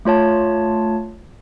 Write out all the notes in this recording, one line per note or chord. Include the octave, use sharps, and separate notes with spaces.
A3 F4 C#5 A5